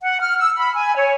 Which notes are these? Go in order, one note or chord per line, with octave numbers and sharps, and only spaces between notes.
F#5
F6
E6
B5
G#5
C#5